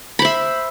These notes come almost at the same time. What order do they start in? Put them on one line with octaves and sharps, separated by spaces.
B5 C5 E5